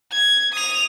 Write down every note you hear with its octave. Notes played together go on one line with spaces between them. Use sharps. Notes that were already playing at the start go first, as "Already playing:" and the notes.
G#6
D#6 F7